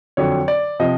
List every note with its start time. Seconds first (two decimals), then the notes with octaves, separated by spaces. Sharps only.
0.17 F2 D3 F#3 C#5
0.48 D5
0.79 C3 F3 D#5